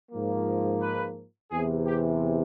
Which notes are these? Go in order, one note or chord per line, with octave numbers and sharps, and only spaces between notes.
G#2 F3 A#3
B4
E2 C3 E3 G#4
G4